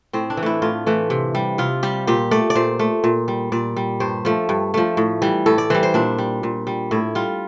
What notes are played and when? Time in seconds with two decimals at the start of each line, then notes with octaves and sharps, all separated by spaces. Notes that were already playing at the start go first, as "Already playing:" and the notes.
0.13 A2 C4
0.30 D4
0.37 E3
0.43 A3 E4
0.62 A2 F4
0.87 E3 A3
1.10 C3
1.35 G3
1.58 C3 F4
1.83 G3 G4
2.07 A#2 G4
2.31 A3 D5
2.50 D5
2.55 A#2 C5
2.79 A3
3.04 A#2
3.28 G3
3.52 A#2 D5
3.77 G3
4.00 G2 C5
4.25 F3 A3
4.49 G2
4.74 F3 A3
4.97 A2
5.22 E3 G3
5.46 A2 A4
5.58 D5
5.70 E3 G3 C5
5.83 C5
5.94 A#2 D4
6.18 G3
6.43 A#2
6.67 G3
6.91 A2 E4
7.15 G3 F4